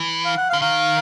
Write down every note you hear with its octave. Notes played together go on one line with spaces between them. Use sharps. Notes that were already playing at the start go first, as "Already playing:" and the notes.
Already playing: E3
F5
F#5
F5
D3
D#3 F5